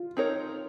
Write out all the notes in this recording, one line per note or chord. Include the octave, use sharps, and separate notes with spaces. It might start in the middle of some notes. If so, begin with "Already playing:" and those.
Already playing: F4
C4 D#4 A#4 C#5